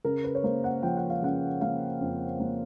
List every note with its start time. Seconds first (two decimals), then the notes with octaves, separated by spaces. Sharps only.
0.05 C#3 A#4
0.24 B4
0.35 C#5
0.44 A#3 C5
0.64 F#5
0.83 F3 G5
0.97 F#5
1.10 F5
1.22 C#3 F#5
1.61 A#3 F5
2.00 F2
2.40 A#3